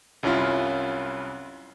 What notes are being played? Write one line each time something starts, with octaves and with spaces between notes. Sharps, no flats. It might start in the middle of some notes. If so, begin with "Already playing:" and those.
C2 F#2 C#4 E4 F4